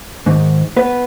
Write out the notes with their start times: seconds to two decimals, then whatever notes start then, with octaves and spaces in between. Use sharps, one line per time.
0.26 G#2 D#3
0.77 B3 B4